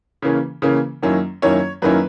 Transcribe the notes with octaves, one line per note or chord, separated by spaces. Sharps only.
C#3 E3 A#3 C#4
C#3 E3 A#3 C#4
F#2 D#3 A#3 C#4 E4
F#2 D#3 A#3 C#4 E4 C#5
F#2 D#3 A#3 C#4 E4 B4